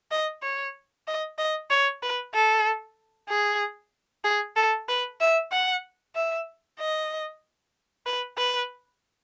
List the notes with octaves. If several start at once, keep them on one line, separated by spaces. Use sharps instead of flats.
D#5
C#5
D#5
D#5
C#5
B4
A4
G#4
G#4
A4
B4
E5
F#5
E5
D#5
B4
B4